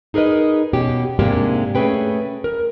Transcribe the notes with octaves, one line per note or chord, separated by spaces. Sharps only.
D#4 G#4 A#4 B4 D#5
B2 C#4 G4
G#2 C3 G#3 A#3 D4 G4
A3 C#4 G#4 B4 G5
A#4